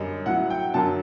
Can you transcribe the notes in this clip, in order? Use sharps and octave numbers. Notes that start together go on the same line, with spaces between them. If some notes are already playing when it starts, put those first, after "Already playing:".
Already playing: F#2 D3 G3 D#5
A2 F#3 F#5
G5
F#2 D3 F#3 A5